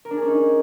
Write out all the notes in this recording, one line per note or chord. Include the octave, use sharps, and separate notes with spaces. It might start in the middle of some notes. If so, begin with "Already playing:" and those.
A#4
D4
G#4
C#4
D#4